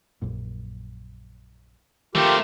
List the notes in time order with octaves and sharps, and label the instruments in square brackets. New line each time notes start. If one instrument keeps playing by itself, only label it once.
[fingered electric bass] A#1 F#2 A#2
[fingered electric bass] D#3 [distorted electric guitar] A3 C4 [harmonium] F4 G4 A#4